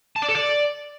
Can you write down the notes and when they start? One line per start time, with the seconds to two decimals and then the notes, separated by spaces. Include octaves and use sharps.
0.16 A5
0.22 D5
0.29 A4
0.35 D5